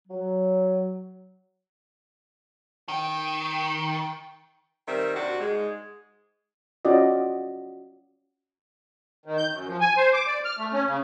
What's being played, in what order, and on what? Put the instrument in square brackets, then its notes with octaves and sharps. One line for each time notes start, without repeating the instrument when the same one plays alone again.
[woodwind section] F#3
[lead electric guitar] D#3 [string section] G5
[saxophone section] D#3 G3 C4 A#4 E5
C3 D4 F#4
G#2 G#3
[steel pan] C#4 F4 F#4 D5 D#5
[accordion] D#3
G6
F#2
F3
G#5
C5
D6
D5
F6
A3
C#4
C#3